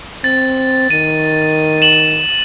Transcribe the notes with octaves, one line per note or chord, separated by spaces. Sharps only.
C4 A6
D#3 D#7
E7 F#7